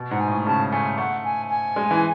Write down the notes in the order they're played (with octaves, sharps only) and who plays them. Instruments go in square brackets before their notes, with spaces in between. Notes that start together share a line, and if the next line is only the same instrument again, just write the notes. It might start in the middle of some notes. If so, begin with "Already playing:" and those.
Already playing: [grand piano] B2
[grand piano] G#2 [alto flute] F#5
[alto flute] G#5
[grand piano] A2
[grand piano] C#3 [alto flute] A5
[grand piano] A3 [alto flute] G#5
[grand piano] A3 [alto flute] F#5
[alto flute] G#5
G#5
[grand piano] G#3
E3